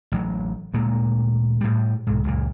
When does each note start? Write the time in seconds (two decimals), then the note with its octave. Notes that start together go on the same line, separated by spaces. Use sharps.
0.12 A1 F#3
0.74 D2 A#2 G#3 A#3
1.61 A2 G3
2.07 B1 G#2
2.24 C#2 F#2 A#2